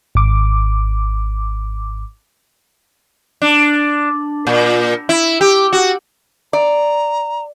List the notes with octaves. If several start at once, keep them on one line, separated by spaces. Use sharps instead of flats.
G#1 D6
D4
A#2
E4
G4
F#4
D5 A#5